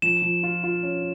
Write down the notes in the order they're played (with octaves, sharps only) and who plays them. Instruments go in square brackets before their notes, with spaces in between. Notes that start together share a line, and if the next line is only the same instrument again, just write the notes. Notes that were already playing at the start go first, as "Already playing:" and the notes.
[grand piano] F3 [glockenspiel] E7
[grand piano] F3
F4
F4
C#4